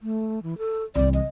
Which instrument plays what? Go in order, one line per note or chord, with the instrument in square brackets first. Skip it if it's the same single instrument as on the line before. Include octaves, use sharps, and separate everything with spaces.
[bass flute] A3
E3
A4
[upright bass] C2 E3 [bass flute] D5
[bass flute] D#5